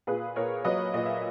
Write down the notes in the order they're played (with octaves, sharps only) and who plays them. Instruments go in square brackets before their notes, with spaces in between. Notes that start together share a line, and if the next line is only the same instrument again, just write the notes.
[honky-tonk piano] A#2 G#4 B4
A#2 A#4 C#5
F#3 B4 D#5
A#2 D#5
E5